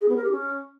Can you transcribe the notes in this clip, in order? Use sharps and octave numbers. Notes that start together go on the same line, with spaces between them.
G#4
B3
A#4
G4
C#4